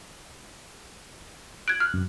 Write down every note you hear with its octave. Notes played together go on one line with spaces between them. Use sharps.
F#6 G#6 D7
F6
F#2